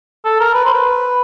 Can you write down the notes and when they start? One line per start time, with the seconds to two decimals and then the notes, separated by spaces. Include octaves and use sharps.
0.25 A4
0.40 A#4
0.54 B4
0.65 C5
0.74 B4